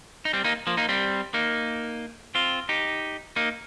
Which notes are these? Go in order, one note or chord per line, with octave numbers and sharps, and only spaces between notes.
D#4
G3 C4
A#3 D#4
F3 A#3
A#3 D#4
G3 C4
A#3 D#4
C4 F4
D#4 G4
A#3 D#4